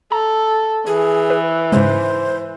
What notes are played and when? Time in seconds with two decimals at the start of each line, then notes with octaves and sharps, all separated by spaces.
0.12 A4 A#5
0.87 E3 G#4
1.30 B4
1.72 G#2 C#3 G#3 C5